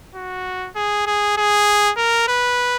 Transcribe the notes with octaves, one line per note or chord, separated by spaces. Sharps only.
F#4
G#4
G#4
G#4
A#4
B4